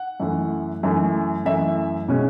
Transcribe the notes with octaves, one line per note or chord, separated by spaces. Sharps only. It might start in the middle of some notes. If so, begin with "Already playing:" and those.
Already playing: F#5
F#2 E3 A3
F#2 E3 A3
F#2 E3 A3 E5
B2 G#3 C#4